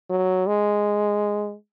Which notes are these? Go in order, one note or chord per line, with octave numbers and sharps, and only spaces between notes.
F#3
G#3